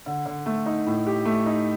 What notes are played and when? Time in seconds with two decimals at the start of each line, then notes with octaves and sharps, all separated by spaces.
0.06 D3
0.26 D3
0.46 A3
0.66 D#4
0.87 A2
1.07 G4
1.25 A3
1.46 D#4